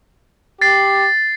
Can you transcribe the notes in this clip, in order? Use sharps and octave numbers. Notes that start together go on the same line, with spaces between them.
G4 A6 C7